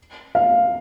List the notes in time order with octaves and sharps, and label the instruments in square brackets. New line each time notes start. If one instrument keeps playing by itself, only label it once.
[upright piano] F5